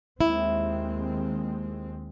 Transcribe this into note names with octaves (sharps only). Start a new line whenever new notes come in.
D#2 G#3 C4 E4